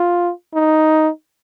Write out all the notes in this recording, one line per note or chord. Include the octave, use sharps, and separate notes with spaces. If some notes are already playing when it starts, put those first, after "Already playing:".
Already playing: F4
D#4